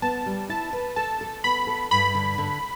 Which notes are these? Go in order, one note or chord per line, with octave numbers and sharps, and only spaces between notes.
B3 A5
G3
E4 A5
B4
A4 A5
A4
B3 B5
A4
G2 B5
D3
D3